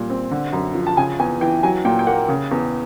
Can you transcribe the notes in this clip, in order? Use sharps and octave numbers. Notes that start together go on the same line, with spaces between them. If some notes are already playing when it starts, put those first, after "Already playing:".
Already playing: A#2 G3
C4
D3
F#2
F3
A5
C#3 G#5
E2 G#5
E3 G5
F#3 G#5
A#2 G5
G5
A#3 F#5
C#3
E2